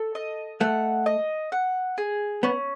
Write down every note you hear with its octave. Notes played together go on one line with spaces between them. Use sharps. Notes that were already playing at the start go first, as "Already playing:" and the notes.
Already playing: A4
D#5
A3 F#5
D#5
F#5
G#4
B3 C#4